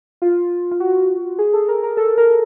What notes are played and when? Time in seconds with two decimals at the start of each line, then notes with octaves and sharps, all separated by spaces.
0.22 F4
0.72 F4
0.80 F#4
1.38 G#4
1.53 A4
1.68 A#4
1.83 A#4
1.97 A4
2.18 A#4